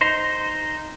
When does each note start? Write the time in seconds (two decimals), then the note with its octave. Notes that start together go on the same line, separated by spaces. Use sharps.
0.01 D#4 C5